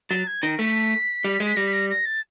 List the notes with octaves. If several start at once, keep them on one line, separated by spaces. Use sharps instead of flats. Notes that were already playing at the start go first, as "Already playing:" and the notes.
F#3 A6
G#6
D#3 A#6
A3 B6
G3
G#3
B6
G3 A#6
B6
A#6
A#6
A6